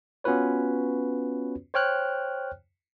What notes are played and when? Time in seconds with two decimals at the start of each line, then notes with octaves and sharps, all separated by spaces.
0.24 B3 C#4 F4 F#4 B4 C#5
1.74 C5 C#5 G5 F6 F#6